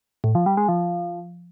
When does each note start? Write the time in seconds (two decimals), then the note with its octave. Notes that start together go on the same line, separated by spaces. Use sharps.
0.24 A2
0.35 F3
0.46 G3
0.57 G#3
0.69 F3